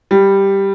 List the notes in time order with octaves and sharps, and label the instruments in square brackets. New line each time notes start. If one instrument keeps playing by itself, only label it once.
[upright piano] G3